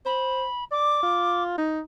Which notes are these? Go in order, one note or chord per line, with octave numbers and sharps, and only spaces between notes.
C5 B5
D5 D6
F4
D#4